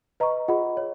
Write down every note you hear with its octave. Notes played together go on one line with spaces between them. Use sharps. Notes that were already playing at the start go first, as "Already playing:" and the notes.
B4 D#5 A#5 C#6
F4 G#4 D#5 F#5 B5
C#5